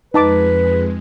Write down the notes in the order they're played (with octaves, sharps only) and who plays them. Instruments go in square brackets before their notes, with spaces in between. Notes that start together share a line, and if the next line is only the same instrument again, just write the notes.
[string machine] F2 G#3 [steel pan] D#4 A5 D6 [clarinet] B4